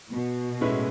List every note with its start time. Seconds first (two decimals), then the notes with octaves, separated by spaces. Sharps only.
0.11 B2
0.61 A2 G#3 C#4 E4 B4